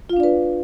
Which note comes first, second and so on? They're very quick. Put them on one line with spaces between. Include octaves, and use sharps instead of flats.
F4 F5 D4 D5 B4